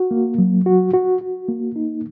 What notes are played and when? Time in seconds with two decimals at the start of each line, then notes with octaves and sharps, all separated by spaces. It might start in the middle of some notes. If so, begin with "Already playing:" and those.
Already playing: F#4
0.11 A#3
0.38 F#3
0.66 F#4
0.94 F#4
1.21 F#4
1.49 A#3
1.76 D#4